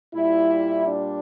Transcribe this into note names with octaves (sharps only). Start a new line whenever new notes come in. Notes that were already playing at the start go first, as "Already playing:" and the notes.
A#2 G3 E4
D4